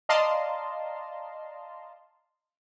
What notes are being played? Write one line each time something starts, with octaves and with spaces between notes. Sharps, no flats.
D5 D#5 F5 A5 A#5 C6